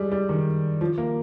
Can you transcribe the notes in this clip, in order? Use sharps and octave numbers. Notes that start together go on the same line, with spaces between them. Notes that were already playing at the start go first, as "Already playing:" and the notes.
Already playing: G3 G#3
G3
D#3
F3
A#3